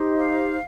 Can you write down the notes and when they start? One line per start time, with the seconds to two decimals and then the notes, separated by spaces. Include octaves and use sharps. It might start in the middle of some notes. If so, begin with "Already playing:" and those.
Already playing: D#4 G4 C5
0.16 F5